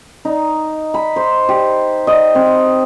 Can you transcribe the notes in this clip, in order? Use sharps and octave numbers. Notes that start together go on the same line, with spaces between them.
D#4
B5
C5
G4
D#5
C4